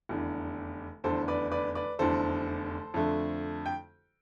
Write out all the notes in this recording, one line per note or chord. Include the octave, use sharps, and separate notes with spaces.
F1 E2 D3
F1 E2 D3 A4 C5
B4 D5
B4 D5
B4 D5
F1 E2 D3 A4 C5
F2 D3 A3
G5